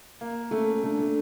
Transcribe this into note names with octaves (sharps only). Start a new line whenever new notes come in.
A#3
A3 C#4
A3 D4
A3